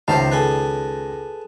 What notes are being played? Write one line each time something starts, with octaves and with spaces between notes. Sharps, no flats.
C#2 D#3 C5 E5 F5 A5
G#4 A4 B4